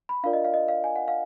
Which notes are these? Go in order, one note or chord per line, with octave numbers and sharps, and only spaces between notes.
B5
D4 F4 A#4 D5 F5
D#5
F5
D#5
F5
G#5
F#5
F5